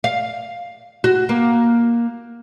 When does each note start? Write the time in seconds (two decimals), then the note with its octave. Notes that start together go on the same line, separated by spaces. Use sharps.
0.04 F5
1.04 F#4
1.29 A#3